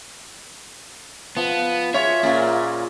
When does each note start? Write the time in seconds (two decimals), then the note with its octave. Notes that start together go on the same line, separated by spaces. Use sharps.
1.37 F3 B3
1.94 F4 F#4 G#4 C#5 E5
2.23 A#2 A#3 C#4